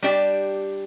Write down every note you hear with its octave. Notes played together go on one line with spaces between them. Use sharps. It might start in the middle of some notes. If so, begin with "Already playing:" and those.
G3 D4 G4 D5